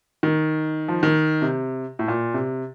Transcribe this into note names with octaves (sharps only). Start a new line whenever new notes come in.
D#3
F3
D#3
C3
A2
A#2
C3